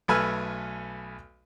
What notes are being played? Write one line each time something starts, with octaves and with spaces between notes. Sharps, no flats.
B1 A3 B4 G#5 E6 F6